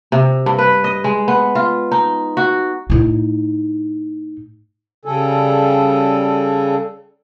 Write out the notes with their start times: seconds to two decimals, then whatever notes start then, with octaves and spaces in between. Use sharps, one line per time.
0.12 C3
0.46 G2
0.58 B4
0.84 D#5
1.04 G#3
1.28 B3
1.55 F4
1.92 D#4
2.37 F#4
2.90 A2 D#4
5.05 C#3 G3 G#4 A4